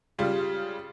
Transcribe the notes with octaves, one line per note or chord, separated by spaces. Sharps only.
C#3 G3 F4